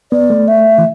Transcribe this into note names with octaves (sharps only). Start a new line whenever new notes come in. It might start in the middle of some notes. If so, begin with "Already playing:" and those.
B3 D5
A3
E5
E3